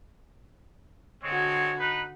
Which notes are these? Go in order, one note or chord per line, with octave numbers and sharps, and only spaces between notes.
D3 G#3 C4 F#4 C#5
D#4 B4